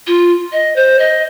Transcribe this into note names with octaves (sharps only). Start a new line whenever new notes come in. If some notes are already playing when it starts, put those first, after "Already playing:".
F4
D#5
C5
D#5